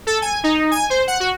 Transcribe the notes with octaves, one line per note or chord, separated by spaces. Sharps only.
A4
G#5
D#4
G#5
C5
F#5
F#4